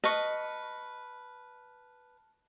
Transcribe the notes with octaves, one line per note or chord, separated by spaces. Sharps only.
B4 D#5 A5 C#6 F6